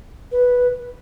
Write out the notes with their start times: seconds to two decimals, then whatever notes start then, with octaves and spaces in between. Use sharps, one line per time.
0.32 B4